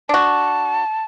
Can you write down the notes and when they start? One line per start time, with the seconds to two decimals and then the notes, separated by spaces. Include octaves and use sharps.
0.09 D4 F#4 A5